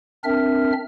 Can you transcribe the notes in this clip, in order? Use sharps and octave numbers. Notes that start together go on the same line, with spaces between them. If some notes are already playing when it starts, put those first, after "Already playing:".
C4 D4 A#4 E5 F6